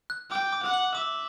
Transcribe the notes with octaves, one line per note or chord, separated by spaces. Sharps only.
F#6
G5 D6
D6
F#5
F#7
E5 D6